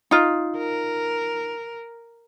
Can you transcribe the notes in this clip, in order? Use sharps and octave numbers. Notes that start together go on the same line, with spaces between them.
D#4 F4
A#4